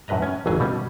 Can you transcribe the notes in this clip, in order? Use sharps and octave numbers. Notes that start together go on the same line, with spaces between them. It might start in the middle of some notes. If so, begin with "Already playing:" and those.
F#2 A2 B4 D#5 A#5
C#4 G#5
G#1 F2 E3 F#3 G#4 G#5
B2 G3 C#4